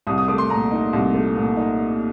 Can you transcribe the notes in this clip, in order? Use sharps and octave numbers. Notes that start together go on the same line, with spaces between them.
C2 D#6
D#6
A3 D6
C6
A#2 A#5
D#4
C2
A3
A#2
D#4